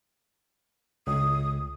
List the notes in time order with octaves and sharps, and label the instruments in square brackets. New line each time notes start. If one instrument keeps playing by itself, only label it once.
[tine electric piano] C#2 [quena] D#6